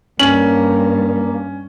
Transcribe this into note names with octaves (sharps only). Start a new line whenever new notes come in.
G2 A#3 C#4 F#7